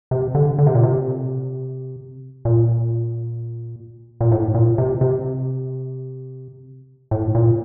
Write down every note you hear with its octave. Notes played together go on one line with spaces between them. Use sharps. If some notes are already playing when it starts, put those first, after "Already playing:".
C3
D3
D3
C3
A#2
C3
A#2
A#2
A2
A#2
C3
C3
A2
A#2